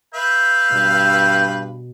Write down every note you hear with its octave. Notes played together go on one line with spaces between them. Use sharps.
B4 E5 F5 G6
G2 B2